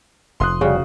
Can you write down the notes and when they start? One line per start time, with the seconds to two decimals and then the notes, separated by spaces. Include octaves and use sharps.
0.40 F1 C6 D#6 F#6
0.61 C#3 G3 C#4 F#4